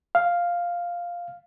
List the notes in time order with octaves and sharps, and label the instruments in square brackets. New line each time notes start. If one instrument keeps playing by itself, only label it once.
[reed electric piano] F5